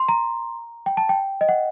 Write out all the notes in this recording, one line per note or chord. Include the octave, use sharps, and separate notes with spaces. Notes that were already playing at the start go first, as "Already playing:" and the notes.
Already playing: C6
A#5
G5
A5
G5
D#5
F#5